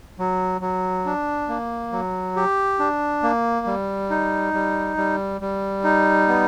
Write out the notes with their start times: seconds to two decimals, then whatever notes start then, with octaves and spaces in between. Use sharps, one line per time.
0.19 F#3
0.61 F#3
1.06 D4
1.49 A#3
1.92 F#3
2.36 G4
2.79 D4
3.23 A#3
3.66 G3
4.10 D#4
4.54 G3
4.97 G3
5.41 G3
5.84 D#4
6.28 B3